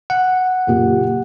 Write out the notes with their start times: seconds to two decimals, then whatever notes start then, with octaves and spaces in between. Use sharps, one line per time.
0.10 F#5
0.67 F#1 A#2 G4